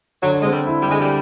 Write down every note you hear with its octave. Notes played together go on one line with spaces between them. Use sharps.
D3 F#3
G#3 C4
G3
E4
G3
D3 G#3
G3